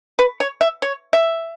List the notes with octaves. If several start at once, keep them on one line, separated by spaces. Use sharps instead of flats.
B4
C#5
E5
C#5
E5